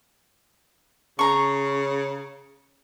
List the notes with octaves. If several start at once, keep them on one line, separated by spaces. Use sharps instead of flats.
C#3 A#5 C#6